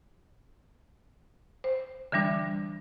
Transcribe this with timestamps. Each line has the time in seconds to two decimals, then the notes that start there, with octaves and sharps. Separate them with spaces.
1.64 C5
2.12 D3 E3 G3 D4